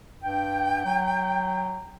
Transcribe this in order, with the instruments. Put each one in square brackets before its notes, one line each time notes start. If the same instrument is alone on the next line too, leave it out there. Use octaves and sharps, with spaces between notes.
[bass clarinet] G2 [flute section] G5
[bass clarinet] F#3